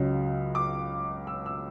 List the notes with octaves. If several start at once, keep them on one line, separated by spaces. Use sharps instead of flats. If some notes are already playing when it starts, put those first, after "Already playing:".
Already playing: C#2 C#3 F#3
D6
E6
E6